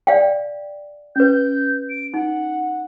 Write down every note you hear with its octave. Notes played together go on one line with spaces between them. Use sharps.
D5 F5 G5
C#4 B4 G6
D7
D#4 F#5